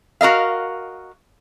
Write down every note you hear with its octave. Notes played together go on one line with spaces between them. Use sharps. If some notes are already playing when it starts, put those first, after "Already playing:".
F#4 A#4 D#5 F5